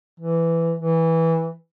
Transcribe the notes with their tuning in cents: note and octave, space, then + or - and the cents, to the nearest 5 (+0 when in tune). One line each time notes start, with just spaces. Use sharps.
E3 +10
E3 -10